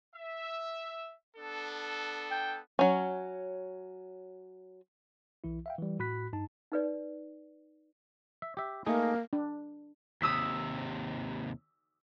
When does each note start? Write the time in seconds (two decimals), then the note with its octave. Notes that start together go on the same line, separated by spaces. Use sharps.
0.16 E5
1.37 B3 D4 A4
2.31 G5
2.79 F#3 C#4
5.44 B1 E3 E4
5.66 E5 F5 G5
5.78 E3 G3
5.99 A2 F#4 B5 F#6 B6
6.33 G2 D#4 A5
6.72 D#4 B4 D5
8.42 E5
8.57 G4 E5
8.86 A3 A#3 D#4 G#4
9.33 D4
10.22 D#2 C3 D#6 E6 B6